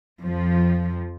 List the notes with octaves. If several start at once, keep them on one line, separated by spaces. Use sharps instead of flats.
F2 F3